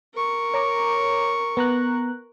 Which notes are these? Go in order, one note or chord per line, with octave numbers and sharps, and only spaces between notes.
A#4 C#6
C#5 A#5 D6
B3 A#5 F#6